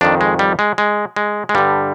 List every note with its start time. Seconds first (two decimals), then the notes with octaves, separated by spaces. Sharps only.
0.01 F2 D#3 D4
0.21 G#3
0.39 G3
0.59 G#3
0.78 G#3
1.16 G#3
1.49 G#3
1.55 G2 D3 G3